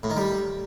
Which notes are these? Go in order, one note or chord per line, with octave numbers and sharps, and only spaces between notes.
A2
D#3
G3